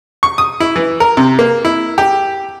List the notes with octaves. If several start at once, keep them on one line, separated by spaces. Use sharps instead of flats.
C#6
D#6
E4
E3
A#4
C3
A#3
E4
G4